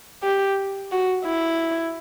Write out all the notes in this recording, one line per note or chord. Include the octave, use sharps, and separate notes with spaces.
G4
F#4
E4